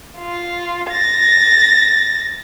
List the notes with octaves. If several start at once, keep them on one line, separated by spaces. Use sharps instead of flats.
F4
A6 A#6